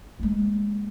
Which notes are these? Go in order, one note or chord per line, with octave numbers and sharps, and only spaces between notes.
G#3 A#3